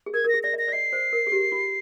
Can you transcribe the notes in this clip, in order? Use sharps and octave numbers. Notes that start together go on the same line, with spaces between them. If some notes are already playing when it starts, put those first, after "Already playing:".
G#4
A#4 G#6
A#4
A#6
G#4
D5 A#6
D#5
A#6
D5
D#5 C7
C5
A#4
G#4
G4
F4